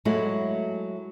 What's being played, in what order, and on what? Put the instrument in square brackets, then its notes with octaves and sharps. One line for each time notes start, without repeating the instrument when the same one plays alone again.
[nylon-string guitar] F#3 G#3 A3 E4 F#4